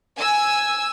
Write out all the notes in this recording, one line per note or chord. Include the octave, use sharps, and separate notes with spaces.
G#5 E6